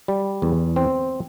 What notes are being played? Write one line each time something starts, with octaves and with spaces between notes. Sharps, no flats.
G3
E2
C4